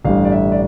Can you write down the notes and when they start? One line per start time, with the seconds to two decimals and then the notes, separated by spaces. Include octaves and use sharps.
0.05 A1 G2 D3 G3 F5
0.25 D5
0.32 E5
0.52 D5